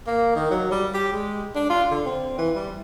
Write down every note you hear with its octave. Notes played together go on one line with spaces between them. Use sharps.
A#3
D#3
F#3
G3
G4
G#3
D4
F4
D3
C4
E3
G3